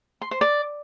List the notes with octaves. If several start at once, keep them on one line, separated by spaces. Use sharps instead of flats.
C6
C5
D5